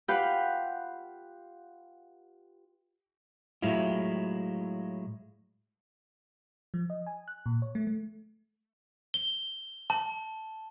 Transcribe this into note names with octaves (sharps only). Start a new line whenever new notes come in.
F4 G4 B4 F5 F#5 G6
A2 F#3 G#3 E4 F4
F3
D#5
G#5
F#6
A#2
C#5
A3
A3
G7
A5